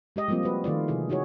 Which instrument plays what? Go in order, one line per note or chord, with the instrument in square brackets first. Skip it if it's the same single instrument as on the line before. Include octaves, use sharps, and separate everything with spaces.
[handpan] G#3 G4 D#5
F3 G3 A#3 C4 F4
F#4 B4
D#3 A3 F4 D5
C3 E3 E4 G#4 A4
D#4 F#4 G#4 C#5